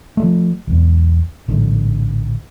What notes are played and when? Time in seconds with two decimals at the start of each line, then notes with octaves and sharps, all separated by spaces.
0.17 F3 F#3 A3
0.67 B1 E2
1.48 A#1 A2 D3